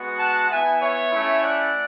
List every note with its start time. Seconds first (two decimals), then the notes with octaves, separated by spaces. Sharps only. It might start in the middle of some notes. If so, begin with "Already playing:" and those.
Already playing: G#3 B3 F#4
0.20 F#5 A5
0.50 B3 E4 E5 G#5
0.82 C#5 E5
1.12 A3 C#4 E4
1.43 D5 F#5